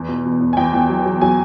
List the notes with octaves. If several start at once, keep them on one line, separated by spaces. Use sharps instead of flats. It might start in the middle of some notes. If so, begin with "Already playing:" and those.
Already playing: E2
B2
B2
E2
G#5
E2 G5
E2
F#3
F#3
F#3 G#5